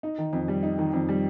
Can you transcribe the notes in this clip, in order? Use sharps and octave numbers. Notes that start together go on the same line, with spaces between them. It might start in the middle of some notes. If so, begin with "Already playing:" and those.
D#4
D#3
F2
G3
D#4
D#3
F2
G3